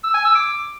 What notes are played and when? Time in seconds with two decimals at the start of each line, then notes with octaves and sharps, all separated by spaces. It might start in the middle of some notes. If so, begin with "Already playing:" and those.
0.03 E6
0.14 G#5
0.25 E6
0.35 D6